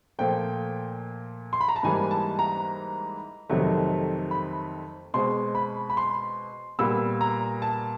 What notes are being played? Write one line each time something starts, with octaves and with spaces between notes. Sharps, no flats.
A#2 F3 A3 G5
C6
B5
A#5
A5
G#2 E3 G3 A#3 G#5
A5
A#5
F2 C3 D#3 F#3 A3
B5
B2 G#3 C4 C6
B5
B5
C6
A#2 G3 B3 E6
A#5
A5